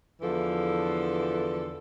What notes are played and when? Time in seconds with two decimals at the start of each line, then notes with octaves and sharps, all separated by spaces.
0.21 E2 D3 E3 F3 A4